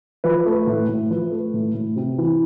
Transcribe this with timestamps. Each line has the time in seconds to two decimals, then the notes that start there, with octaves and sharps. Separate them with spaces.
0.24 F3 B4
0.46 A3
0.67 A2
0.88 A2
1.10 F3 B4
1.31 A3
1.54 A2
1.74 A2
1.96 C3
2.18 E3